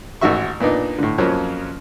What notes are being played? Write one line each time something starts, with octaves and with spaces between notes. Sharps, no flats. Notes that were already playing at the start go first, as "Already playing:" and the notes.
A1 G#2 D#3 F#4 E5 C#6
A#2 B3 D4 D#4
A2 D3
F2 F3 F#3 A#3 C#4